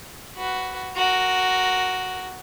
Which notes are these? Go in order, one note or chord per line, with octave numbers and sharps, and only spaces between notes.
F#4 B4
F#4 A#4